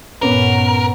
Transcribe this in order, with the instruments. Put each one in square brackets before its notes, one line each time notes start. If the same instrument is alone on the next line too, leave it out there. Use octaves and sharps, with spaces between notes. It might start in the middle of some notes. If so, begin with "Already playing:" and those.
[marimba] G2 A#2 C#5 [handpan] B3 C#4 B4 [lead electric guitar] A#4